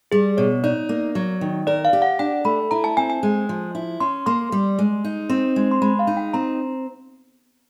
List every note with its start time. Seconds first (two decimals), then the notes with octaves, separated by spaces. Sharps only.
0.12 G3 G#4
0.37 B2 C#5
0.64 D#4 D5
0.89 A#3
1.15 F#3
1.41 D#3
1.67 A#4 D5
1.85 F5
1.93 G4
2.02 F#5
2.19 D4 G5
2.45 A3 B5
2.71 E4 A#5
2.84 A5
2.97 C4 G#5
3.10 G#5
3.23 G#3
3.49 F3
3.75 E4
4.00 C#4 C6
4.26 A#3 C6
4.52 G3
4.79 G#3
5.05 D#4
5.29 C4
5.56 G#3
5.71 C6
5.82 G#3 B5
5.99 F5
6.07 D#4
6.17 G5
6.33 C4 A#5